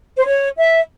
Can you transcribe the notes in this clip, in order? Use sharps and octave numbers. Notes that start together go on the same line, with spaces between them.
C5
C#5
E5